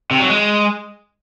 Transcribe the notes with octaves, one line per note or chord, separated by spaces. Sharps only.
C3
F#3
G#3